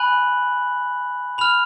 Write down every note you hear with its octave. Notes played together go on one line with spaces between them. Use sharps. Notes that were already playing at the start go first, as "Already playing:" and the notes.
Already playing: G#5 B5 F#6 F#7
B5 F6 F7